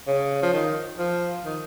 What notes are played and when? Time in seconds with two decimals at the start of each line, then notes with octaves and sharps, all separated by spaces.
0.07 C#3
0.43 F3
0.53 D#3
0.99 F3
1.45 D#3